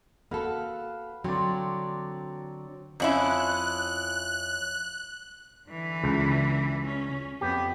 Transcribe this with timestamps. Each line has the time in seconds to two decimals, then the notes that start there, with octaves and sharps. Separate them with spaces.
0.31 A#3 F#4 A4 B4 F5 F#5
1.24 D3 F#3 C4 D5
3.00 F2 C#4 E4 F#6
5.68 D3 E3
6.04 C#2
6.86 C#4
7.41 F2 B3 G4